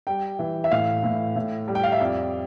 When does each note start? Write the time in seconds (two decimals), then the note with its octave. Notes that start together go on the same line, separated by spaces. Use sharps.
0.07 G3 G5
0.39 E3
0.64 E5
0.71 A2 F5
1.04 A2
1.36 A2
1.68 G3
1.75 G5
1.83 F5
1.92 E5
2.00 F2 D5